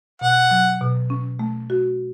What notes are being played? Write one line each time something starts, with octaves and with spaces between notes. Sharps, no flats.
B2 F#5
F#3
B2
C#4
A3
F#4